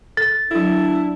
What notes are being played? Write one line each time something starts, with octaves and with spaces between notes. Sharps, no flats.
A4 A6
F#3 D4 E4 A4